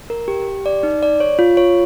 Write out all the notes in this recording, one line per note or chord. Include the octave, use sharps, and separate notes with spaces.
A#4
G4
G4
D5
D#4
D5
C#5
F4
C#5